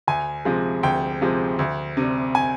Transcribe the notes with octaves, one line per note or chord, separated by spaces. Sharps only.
D2 G#5
C3 F3 G#3
D2 G5
C3 F3 G#3
D2
C3 G3
G#5